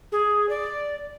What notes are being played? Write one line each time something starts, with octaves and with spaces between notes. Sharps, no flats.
G#4
D5